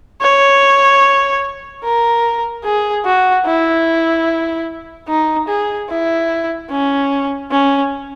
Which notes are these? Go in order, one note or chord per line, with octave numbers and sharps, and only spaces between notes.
C#5
A#4
G#4
F#4
E4
D#4
G#4
E4
C#4
C#4